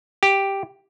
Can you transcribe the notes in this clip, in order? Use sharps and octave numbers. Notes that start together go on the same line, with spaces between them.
G4